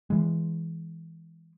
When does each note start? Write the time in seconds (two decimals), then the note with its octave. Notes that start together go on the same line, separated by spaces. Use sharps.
0.10 E3 G#3